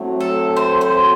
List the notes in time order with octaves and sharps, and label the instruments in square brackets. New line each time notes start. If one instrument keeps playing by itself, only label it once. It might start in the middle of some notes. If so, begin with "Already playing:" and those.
Already playing: [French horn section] A2 F#3 A3 C4 F#4
[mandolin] A4
C5
C5